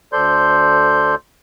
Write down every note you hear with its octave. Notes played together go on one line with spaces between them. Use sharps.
D2 A4 C5 D5 C6 G6